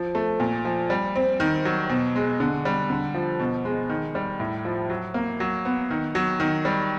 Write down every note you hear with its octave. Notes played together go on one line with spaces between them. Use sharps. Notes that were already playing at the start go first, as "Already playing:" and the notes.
Already playing: F3
A3
A#2
F3
G3
C4
D#3
F#3
B2
G#3
D3
G3
D3
F3
B2
G#3
D#3
G3
A2
F3
F#3
A#3
F#3
B3
D#3
F#3
D#3
G3